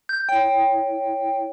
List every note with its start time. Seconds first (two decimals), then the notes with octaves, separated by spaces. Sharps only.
0.09 G6
0.29 E4 C#5 G5